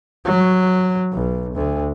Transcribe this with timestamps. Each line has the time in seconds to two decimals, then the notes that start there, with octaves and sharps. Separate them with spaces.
0.25 F#3
1.13 B1
1.54 D2